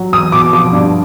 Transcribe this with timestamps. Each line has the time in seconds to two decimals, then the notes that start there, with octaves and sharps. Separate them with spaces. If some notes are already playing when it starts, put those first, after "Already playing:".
Already playing: F#3
0.13 E2 D#6
0.32 B2 D6
0.53 F3 D6
0.73 G2